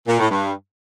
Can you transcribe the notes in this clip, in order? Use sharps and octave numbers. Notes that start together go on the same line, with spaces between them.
A#2
A2
G2